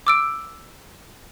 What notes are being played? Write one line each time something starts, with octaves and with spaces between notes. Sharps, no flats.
D6 E6 D7